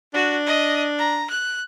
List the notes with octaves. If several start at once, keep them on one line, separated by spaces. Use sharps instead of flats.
D4 F#4
D#5
A#5
F#6